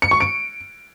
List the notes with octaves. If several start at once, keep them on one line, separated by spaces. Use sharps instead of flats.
C#7
C#6
D7